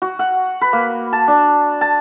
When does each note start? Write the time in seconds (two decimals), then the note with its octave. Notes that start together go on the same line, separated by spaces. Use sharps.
0.02 F#4
0.19 F#5
0.61 B4
0.73 A#3
1.13 A5
1.28 D4
1.81 A5